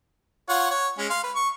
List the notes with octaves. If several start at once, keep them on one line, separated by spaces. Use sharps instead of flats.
F4 C#5 F#5
C#5
G#3 C#4
F5 C6
B4
C#6